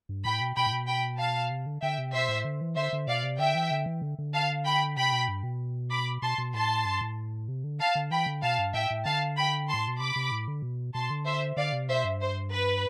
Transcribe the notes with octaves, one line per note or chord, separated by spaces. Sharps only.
G2
A2 G5 B5
B2
B2 G5 B5
A2
B2
G5 B5
F5 A5
C3
D3
D3 E5 G5
C3
B2 C5 E5
A2
D3
E3
D3 C5 E5
D3
B2 D5 F5
C3
D3 E5 G5
E3
D3
E3
D3
D3
F5 A5
G5 B5
C3 G5 B5
B2
G2
B2
B5 D6
B2 A5 C6
B2
A2 A5 C6
G2
A2
C3
D3
F5 A5
D3
E3 G5 B5
D3
B2 F5 A5
G2
A2 E5 G5
A2
D3 F5 A5
G5 B5
A5 C6
A2
B2
C3 B5 D6
C3
A2
D3
B2
B2 A5 C6
D3
C5 E5
D3 D5 F5
C3
B2 C5 E5
G2
C5
B4